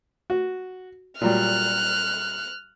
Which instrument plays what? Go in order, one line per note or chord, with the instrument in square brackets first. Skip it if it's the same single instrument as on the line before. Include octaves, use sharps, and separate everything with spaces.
[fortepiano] F#4
[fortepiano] A#2 F#3 G3 [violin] F6 F#6